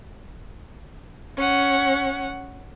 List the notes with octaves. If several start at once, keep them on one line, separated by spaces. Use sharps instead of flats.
C#4 F#5